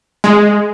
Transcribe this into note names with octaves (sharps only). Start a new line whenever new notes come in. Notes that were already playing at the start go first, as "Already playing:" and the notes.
G#3